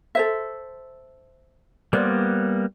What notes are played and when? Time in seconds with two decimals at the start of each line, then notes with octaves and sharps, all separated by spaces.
0.15 A4 C5 E5
1.93 G3 A#3 B3 C5 D5